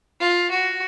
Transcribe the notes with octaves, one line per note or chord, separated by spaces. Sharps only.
F4
F#4